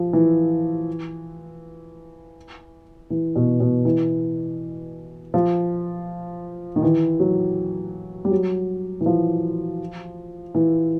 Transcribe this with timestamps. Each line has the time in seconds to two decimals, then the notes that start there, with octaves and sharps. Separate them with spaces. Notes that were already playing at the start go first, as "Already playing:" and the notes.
Already playing: F3
0.13 E3
3.10 E3
3.36 B2
3.60 B2
3.85 E3
5.34 F3
6.76 D#3
6.82 E3
7.20 F#3
8.25 G3
8.31 F#3
9.01 E3
9.06 F3
10.55 E3